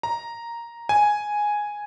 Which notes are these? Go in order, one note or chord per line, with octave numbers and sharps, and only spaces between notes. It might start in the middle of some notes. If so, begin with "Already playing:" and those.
A#5
G#5